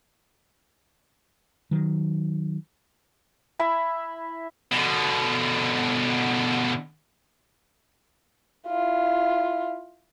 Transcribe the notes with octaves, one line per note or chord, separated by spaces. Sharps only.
D#3 F#3
E4 E5 B5
B2 D3
E4 F4